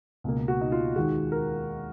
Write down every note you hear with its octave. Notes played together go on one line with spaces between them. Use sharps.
C#2 B2 A#3
F#4
D#4
F4
D#2 D#3 G#3 F#4
A#4